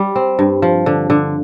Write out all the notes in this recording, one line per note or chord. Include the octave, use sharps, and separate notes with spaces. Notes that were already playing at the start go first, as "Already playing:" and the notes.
Already playing: G3
C4
G2
F3
D3
D3